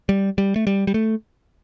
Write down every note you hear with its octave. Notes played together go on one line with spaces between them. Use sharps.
G3
G3
A3
G3
G3
A3